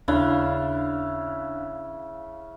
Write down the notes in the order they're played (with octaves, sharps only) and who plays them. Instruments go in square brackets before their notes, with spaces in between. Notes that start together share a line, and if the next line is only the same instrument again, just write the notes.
[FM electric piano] D#2 D4 F#6 [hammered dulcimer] C#3 E4 F5